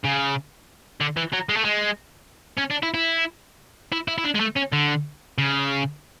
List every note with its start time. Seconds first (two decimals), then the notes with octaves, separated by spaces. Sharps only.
0.04 C#3
1.01 D3
1.17 E3
1.33 F#3
1.49 G#3
1.57 A3
1.65 G#3
2.58 C#4
2.71 D4
2.83 E4
2.94 E4
3.92 E4
4.08 E4
4.18 E4
4.24 D4
4.35 G#3
4.41 A3
4.57 C#4
4.73 D3
5.38 C#3